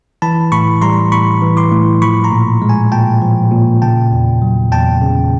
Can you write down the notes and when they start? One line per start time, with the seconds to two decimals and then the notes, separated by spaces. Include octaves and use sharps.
0.22 E3 A5 B5
0.52 A2 B5 C#6
0.82 G3 A#5 C6
1.12 A2 B5 C#6
1.42 E3
1.57 C6 D6
1.72 A2
2.02 F3 B5 C#6
2.24 A#5 C6
2.32 A#2
2.62 G#3
2.69 G#5 A#5
2.92 A#2 G5 A5
3.22 F3
3.52 A#2
3.82 C#3 G5 A5
4.12 E2
4.42 F#3
4.72 E2 G5 A5
5.02 C#3